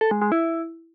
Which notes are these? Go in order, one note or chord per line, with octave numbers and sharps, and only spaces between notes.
A4
G#3
G#3
E4